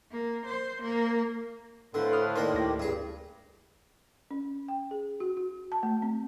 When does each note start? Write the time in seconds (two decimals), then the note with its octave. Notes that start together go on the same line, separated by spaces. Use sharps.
0.11 A#3
0.46 C5
0.82 A#3
1.94 A2 D3 F4 B4 C5
2.13 D#6 F6
2.36 D#3 A#3 D5 D#5 C6
2.54 D2 E4 G4 A#6
2.80 G2 A#2 C#3 G#4
4.31 C#4
4.68 G5
4.91 G#4
5.20 F#4
5.37 F#4
5.72 A5
5.83 A3
6.02 C4